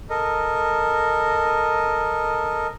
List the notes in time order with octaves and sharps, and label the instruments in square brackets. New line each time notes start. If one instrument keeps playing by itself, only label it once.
[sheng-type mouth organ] A4 A#4 D#5